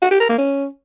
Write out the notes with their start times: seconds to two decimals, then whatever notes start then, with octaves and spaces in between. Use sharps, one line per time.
0.02 F#4
0.11 G4
0.20 A#4
0.29 A#3
0.38 C#4